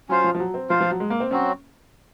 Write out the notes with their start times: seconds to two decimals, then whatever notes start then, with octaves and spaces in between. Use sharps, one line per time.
0.09 F#3 C#4 F4 C5 F5
0.24 F3
0.35 F3
0.40 F#3
0.54 C4
0.69 F3 F4 C5 F5
0.81 F3
0.91 F#3
1.00 G#3
1.10 A#3
1.20 C4
1.31 F#3 C4 C#4 F#4